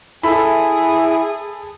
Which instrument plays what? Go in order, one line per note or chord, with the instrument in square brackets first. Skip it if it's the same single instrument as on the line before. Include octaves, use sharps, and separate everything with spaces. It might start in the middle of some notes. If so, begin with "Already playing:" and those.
[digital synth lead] E4 [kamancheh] G#4 [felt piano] A4 B5